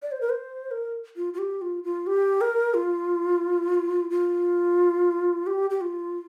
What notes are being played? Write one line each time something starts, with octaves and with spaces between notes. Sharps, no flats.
D5
C5
A#4
C5
A#4
F4
F4
G4
F4
F4
G4
A#4
F4
F4
G4
G4
F4